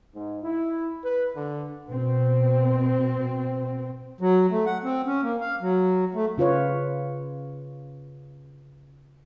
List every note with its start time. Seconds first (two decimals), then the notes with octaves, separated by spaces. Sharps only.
0.14 G#2
0.43 E4
1.04 B4
1.36 D3
1.88 B2 C4
4.21 F#3
4.51 A3
4.66 F#5
4.84 C4
5.06 C#4
5.22 A#3
5.41 F5
5.61 F#3
6.14 A3
6.38 C#3 F4 B4 C#5